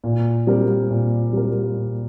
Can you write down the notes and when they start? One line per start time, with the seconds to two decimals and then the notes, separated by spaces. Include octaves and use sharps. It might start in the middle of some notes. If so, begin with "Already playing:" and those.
0.04 A#2
0.47 G3 C4 G4 A#4
0.90 A#2
1.33 G3 C4 G4 A#4
1.76 A#2